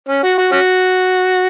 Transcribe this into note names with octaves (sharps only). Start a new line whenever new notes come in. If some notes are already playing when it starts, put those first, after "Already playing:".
C#4
F#4
F#4
C#4 F#4